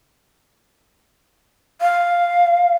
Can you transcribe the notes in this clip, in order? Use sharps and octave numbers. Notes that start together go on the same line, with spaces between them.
F5